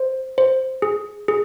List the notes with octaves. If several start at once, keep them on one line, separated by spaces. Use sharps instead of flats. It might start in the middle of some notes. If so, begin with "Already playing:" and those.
Already playing: C5
C5
G#4
G#4